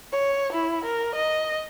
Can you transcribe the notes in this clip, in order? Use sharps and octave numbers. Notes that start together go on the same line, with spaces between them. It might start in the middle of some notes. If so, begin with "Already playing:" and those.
C#5
E4
A#4
D#5